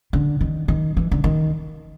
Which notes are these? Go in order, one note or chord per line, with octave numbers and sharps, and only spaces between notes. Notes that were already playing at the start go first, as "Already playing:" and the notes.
D3
D#3
D#3
E3
D3
D#3